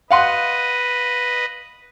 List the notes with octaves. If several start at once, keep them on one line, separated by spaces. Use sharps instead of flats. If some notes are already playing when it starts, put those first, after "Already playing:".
B4 D#5 F5 F#5 C6